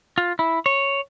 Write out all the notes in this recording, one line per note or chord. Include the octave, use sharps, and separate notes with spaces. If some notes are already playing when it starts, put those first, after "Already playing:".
F4
E4
C#5